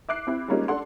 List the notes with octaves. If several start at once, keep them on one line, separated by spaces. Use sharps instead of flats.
E5 D6 F#6 C7
C4 E4
G3 G#3 A#3 C#4 D#4 F4
D4 A4 F#5 C6